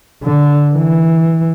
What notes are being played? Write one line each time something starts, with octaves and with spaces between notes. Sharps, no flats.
D3
E3